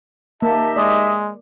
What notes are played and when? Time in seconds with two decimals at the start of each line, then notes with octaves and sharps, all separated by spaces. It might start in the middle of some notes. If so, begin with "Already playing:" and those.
0.42 A#3 D#4 G4 E5 A5
0.76 G#3 D5 D#5